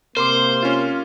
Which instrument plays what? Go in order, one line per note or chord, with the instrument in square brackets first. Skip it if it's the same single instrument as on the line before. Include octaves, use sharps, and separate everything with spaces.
[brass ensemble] C3 A#3 [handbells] A#4 C6 D6 [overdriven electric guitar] C5
[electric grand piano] C#4 F4